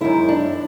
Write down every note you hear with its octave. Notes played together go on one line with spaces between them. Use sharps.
F#2 D#3 G#3 E4
D4